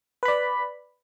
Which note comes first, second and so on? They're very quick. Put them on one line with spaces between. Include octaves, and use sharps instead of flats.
B4 B5 D5